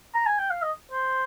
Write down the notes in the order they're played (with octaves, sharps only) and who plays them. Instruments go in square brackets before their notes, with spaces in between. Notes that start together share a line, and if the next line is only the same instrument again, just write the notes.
[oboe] A#5
G#5
G5
F5
D#5
C5